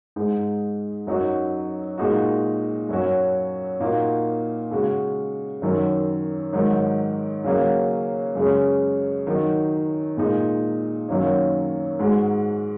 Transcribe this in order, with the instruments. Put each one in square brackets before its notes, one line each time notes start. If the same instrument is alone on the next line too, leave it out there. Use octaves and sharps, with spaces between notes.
[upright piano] G#2 G#3 D#4
F#2 F#3 D#4 F#4
A#2 G#3 D#4 F#4
F#2 F#3 C#4 F#4
A#2 A#3 D#4 F#4
C#3 G#3 F#4
F#2 D#3 F#3
G#2 D#3 F#3 D#4
C#3 F#3 A#3 C#4
F#2 C#3 G#3 C#4
D#3 F#3 D#4
A#2 G#3 D#4
F#2 D#3 F#3 A#3 C#4
G#2 G#3 F#4